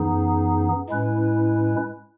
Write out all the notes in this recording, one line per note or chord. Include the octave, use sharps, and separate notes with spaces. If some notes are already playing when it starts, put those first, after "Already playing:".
Already playing: F#2 E3 B3 D#4 G#4
A2 G#3 C#4 E4 B4